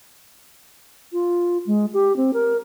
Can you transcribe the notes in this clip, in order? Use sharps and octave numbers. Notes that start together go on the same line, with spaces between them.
F4
G#3
G4
C4
A#4